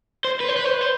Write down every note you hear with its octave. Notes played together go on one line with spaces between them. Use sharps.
C5
B4
C5
B4
C5
B4
C5